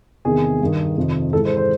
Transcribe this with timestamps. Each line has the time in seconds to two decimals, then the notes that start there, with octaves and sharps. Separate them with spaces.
0.25 E2 C3 D#3 G#4
0.61 G2 D#3
0.97 F2 C3 D#3
1.33 G#2 E3 A4
1.45 C5
1.57 C5